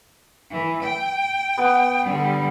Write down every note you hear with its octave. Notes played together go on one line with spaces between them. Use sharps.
E3
G5
B3
D3 G3